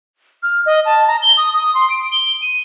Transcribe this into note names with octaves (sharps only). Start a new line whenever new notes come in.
F6
D#5
A5
A#5
G7
D#6
D#6
C6
D7
G7
D#7